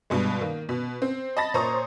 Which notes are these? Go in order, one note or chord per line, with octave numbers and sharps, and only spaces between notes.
G2 B2 G#3
D#3 A#3
B2
C4
D#5 A5 B5 A6 A#6
A#2 C5 C#5 A#5 C#6 D#6